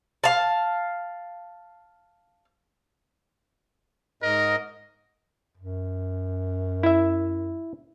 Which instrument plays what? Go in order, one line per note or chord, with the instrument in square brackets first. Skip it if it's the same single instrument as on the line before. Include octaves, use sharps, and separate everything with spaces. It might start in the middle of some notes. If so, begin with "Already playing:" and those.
[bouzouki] F5 A5
[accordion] G#2 D#5 [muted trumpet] A#4
[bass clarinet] F#2
[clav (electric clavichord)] E4 E5